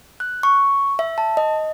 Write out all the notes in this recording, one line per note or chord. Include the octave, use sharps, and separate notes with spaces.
F#6
C#6
E5
A5
D#5